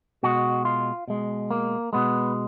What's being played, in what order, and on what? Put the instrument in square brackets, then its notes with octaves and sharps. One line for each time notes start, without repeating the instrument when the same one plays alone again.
[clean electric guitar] B2 G#3 F#4
F4
B2 G#3
A#3
B2 G#3 B3